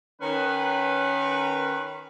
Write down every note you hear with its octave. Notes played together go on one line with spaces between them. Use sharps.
D#3 C#4 B4